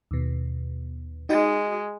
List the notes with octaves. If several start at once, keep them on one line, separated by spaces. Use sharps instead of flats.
D#2 B2
G#3 D#4 F#4 D#5